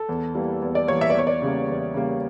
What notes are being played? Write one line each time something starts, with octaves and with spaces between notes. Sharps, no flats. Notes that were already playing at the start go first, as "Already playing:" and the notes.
Already playing: A4
E2
E3 G3 A#3
E2
D5
E3 G3 A#3 C#5
E5
D5
E2 C#5
D5
C#3 G3 A#3
E2
C#3 G3 A#3